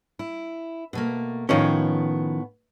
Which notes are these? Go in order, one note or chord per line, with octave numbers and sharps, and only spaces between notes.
E4
B2 A3 A#3
A2 D#3 F3 B3 C#4 C#5